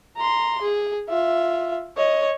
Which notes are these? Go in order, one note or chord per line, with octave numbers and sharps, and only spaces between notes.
A#5 C6
G#4
F4 E5
C#5 D#5